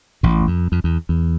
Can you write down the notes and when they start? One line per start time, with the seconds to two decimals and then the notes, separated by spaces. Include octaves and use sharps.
0.23 A1 A2
0.41 E2
0.47 F2
0.72 F2
0.84 E2
1.09 E2